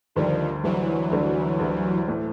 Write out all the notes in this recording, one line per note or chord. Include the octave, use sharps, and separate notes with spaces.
D2 D3 D#3 F3 G3
D2 D3 E3 F#3 G3
D2 D3 G3
D2 D3 G3
A2 E3 A3